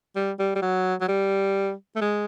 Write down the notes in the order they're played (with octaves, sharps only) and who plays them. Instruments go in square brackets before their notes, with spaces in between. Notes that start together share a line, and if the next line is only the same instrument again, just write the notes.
[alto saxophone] G3
G3
G3
F#3
F#3
G3
A3
G#3